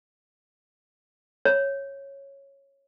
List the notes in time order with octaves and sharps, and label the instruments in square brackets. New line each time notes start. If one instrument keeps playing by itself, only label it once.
[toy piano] C#5